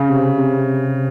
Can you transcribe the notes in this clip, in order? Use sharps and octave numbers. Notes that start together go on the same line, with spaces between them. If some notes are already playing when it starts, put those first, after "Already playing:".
Already playing: C#3
C3
C3